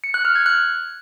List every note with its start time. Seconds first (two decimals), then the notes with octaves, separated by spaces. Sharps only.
0.04 C#7
0.14 F#6
0.25 F6
0.35 G#6
0.46 F#6